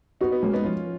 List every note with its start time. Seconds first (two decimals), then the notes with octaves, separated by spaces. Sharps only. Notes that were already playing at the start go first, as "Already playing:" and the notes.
0.21 B3 D#4 F#4
0.31 B3 D#4
0.43 G#3 A#3 C#4
0.53 B3 D#4
0.64 F3 C#4 F4